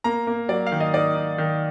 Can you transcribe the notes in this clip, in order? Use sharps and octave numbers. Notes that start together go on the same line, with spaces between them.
A#3 A#5
A#3
F#3 D5
F5
D#3
D#5
D#4 D5
D#4
D#3